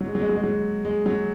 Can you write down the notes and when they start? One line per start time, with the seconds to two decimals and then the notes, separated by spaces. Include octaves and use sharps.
0.01 F#3
0.07 G#3
0.15 F#3
0.21 G#3
0.29 F#3
0.36 G#3
0.44 F#3
0.85 G#3
1.06 F#3